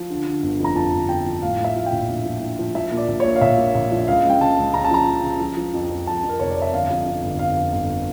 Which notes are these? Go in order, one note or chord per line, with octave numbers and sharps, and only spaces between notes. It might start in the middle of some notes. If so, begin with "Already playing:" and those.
Already playing: F3
D3
D3
G1
F2 A#5
F3 A5
G1
F3 G5
F3
A2 F5
A2
E5
F3 F5
G5
A#1
A#1
F3
F3
F3
F3 E5
A#2
D5
A#1
A#2 C#5
F5
A#1 E5
A#2
A#1
F3
C#2 F5
C#2
G5
C#2 A5
C#2
C#3 A#5
A5
F3 A#5
C#3
C#3
F3
F3
F2
F2
F2 A5
F2
A#4
F1 C#5
D5
F1 E5
G1 F5
F2
F2
G1
G1 F5
F2
G1